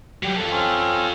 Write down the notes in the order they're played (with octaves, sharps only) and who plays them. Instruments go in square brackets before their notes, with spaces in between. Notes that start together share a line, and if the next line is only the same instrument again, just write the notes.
[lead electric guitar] F#3 G4
F4 A4
[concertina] C4 C#4